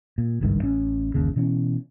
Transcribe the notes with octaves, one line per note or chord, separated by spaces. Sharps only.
A#2
G#1 C#2 G2 D#3
A1 C#4
G1 D#2 C#3
B2 E3 C#4